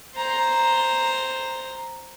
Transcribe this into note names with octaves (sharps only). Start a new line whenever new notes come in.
C5 A#5